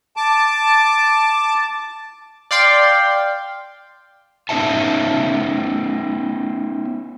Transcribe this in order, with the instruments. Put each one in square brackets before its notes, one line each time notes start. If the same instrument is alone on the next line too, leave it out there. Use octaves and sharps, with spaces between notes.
[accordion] A5 D6
[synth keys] D5 F5 G5 C6
[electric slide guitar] B3 C#4 D#4 C5 E5 A5